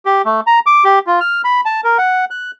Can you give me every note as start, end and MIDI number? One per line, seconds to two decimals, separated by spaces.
0.06 0.22 67
0.25 0.41 57
0.47 0.59 82
0.66 0.84 86
0.84 0.99 67
1.07 1.20 65
1.20 1.42 89
1.44 1.61 83
1.65 1.81 81
1.84 1.98 70
1.98 2.25 78
2.30 2.51 90